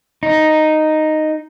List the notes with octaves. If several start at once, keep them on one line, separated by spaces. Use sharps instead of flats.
D#4